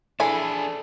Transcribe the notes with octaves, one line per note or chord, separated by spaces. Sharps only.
E3 D4 G#4 A4 G#5 B5